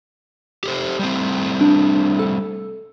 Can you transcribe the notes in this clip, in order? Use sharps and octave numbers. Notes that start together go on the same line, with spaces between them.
G4 A4 C5
G3 A3 C4
D4
A4